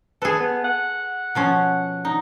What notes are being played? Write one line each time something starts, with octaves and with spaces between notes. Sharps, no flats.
G#4 A4 B4
B3
F#5
B2 F3 C#4
D#4